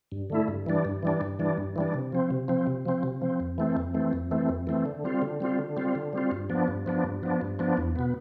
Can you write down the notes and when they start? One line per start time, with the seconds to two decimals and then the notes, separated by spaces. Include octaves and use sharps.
0.12 G2
0.30 D3 A3 E4
0.48 G2
0.66 E3 G3 D4
0.85 G2
1.03 E3 G3 D4
1.21 G2
1.39 E3 G3 D4
1.58 G2
1.76 E3 G3 D4
1.94 C3
2.12 F3 C4
2.30 C3
2.48 F3 C4
2.67 C3
2.86 F3 C4
3.03 C3
3.22 F3 C4
3.40 F2
3.58 E3 A3 C4
3.77 F2
3.94 E3 A3 C4
4.13 F2
4.31 E3 A3 C4
4.49 F2
4.67 E3 A3 C4
4.86 D3
5.04 G3 C4 F4
5.22 D3
5.41 G3 C4 F4
5.59 D3
5.76 G3 C4 F4
5.95 D3
6.13 G3 C4 F4
6.31 G2
6.50 F3 B3 D4
6.68 G2
6.86 F3 B3 D4
7.04 G2
7.23 F3 B3 D4
7.41 G2
7.59 F3 B3 D4
7.77 E2
7.96 B2 B3